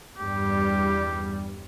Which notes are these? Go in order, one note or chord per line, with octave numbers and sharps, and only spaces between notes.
E2 G2 G3 G4